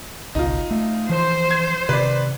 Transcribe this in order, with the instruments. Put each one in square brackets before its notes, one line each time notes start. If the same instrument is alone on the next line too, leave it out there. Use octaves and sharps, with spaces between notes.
[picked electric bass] G#1 C#2 B2 [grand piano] D#4 F4
[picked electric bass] A3
[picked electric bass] E3 F3 [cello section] C5
[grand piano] G#6
[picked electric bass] C3 D#3 [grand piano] B4 D5